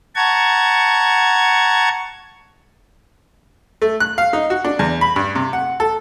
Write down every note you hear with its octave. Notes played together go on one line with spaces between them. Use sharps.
F#5 A5 A#5 C#6 G#6
A3
F#6
F5
D#4
F#4
D4
E2
B5
G2
C3
F#5
A4